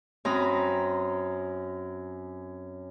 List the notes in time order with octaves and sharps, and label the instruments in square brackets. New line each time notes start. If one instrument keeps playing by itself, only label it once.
[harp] F#2 C4 A#5 B5 D#6